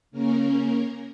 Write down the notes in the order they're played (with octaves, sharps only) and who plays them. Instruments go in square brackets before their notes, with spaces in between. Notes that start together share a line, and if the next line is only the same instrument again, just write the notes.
[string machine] C#3 A#3 C#4 A#4